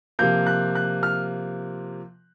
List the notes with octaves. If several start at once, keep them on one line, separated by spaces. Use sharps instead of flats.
C3 F3 A#3 G6
F#6
F#6
F6